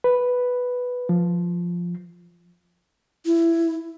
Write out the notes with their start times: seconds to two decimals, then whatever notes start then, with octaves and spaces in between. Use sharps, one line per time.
0.04 B4
1.09 F3
3.26 E4